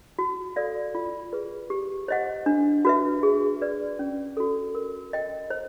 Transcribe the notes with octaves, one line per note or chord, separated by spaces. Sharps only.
F#4
A4 D5 F5
F4
G#4 B4
G4
C5 D#5 F#5
D4
F#4 B4 E5
G#4
B4 D5
C#4
F#4 A4
A#4
D#5 G5
C5